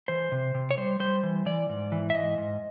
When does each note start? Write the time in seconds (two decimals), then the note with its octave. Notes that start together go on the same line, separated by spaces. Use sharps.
0.08 E3 C5
0.32 C3
0.55 C3
0.71 C#5
0.77 G3 C5
1.00 G3 C5
1.23 E3
1.46 E3 D5
1.69 G#2
1.92 E3
2.10 E5
2.14 G#2 D#5
2.38 G#2